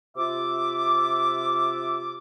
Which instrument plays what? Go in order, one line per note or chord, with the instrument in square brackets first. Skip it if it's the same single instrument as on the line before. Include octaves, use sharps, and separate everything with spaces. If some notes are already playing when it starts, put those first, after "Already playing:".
[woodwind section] C3 F4 E5 D6